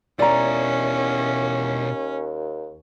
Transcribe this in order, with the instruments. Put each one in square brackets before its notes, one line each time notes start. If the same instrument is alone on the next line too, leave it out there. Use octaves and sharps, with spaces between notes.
[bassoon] D#2 [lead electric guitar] B2 E4 [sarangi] C#4 [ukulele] D5 A#5